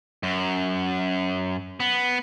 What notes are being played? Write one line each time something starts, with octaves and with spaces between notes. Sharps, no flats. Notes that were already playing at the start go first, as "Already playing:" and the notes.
F#2
B3